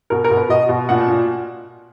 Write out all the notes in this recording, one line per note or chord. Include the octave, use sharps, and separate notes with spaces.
B2 A#4
A#4
B2
B4
B2 D#5
B2
A#2 F#5
A#2